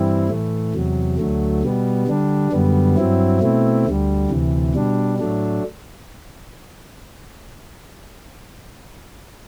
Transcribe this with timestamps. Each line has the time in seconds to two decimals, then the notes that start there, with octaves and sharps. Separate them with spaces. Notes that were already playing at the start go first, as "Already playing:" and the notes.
Already playing: G2 E3 G3 C4 E4
0.29 A2 E3 A3
0.74 E2 C3 F#3
1.18 D2 D3 F#3 A3
1.63 B2 G3 B3
2.07 D3 G3 D4
2.52 F#2 D3 G3 B3
2.97 G2 F#3 C4 E4
3.41 B2 A3 C4 E4
3.86 D2 D3 G3
4.30 D2 C3 E3
4.75 B2 G3 D4
5.19 A2 F#3 A3 D4